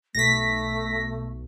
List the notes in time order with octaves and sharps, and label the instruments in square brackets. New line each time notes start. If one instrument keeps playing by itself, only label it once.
[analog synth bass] B1 [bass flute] A3 [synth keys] A#6 B6